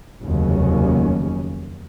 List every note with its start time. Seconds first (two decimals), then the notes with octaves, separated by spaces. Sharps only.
0.22 F1 D#2 C#3 F#3 C#4